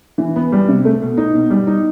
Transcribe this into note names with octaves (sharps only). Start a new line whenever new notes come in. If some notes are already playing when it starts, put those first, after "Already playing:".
E3
B3
G3
C3
A3
B2
D#4
B2
G3
D#4